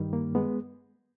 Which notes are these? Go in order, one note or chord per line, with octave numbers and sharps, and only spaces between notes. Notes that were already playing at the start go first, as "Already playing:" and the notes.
Already playing: G2 D#3 G3
A#3
G#3 B3